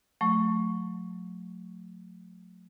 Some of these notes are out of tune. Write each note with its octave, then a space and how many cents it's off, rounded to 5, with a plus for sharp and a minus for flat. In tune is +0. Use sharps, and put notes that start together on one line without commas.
F#3 -40 A3 +0 C#6 +0